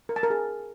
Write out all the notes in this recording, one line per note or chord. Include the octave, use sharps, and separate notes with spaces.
A#4
A5
A#4
G#4